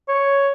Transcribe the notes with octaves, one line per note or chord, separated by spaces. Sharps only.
C#5